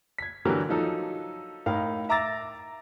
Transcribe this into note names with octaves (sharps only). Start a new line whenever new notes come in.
G#6 B6
D3 E3 F#3 F#4 G4 A#4
F3 F#3 D#4 A4
A2 D#4 A#4 F5
E5 A#5 D6 E6 A6 A#6